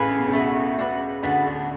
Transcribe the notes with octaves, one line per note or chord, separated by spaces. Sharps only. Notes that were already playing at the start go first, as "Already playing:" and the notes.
Already playing: A1 A2 G#4 B4 F5 G#5
C#3
B2
C#2 C#3
A3 D4 F#4
D4 F#4 B4
D2 D3 B3 D4 F#4
D2 D3